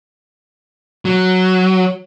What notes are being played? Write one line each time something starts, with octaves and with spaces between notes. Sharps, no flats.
F#3